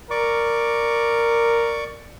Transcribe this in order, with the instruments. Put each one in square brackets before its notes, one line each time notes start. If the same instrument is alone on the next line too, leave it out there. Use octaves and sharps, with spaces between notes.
[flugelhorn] A#4 [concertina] D5 C#6 D6